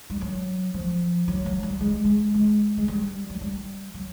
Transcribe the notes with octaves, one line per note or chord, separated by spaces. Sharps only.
G3
F#3
F3
F#3
F#3
G3
G#3
G#3
G#3
G#3
G3
F#3
G3
F#3